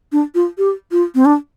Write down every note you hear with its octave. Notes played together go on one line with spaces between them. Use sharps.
D4
F4
G4
F4
C4
D4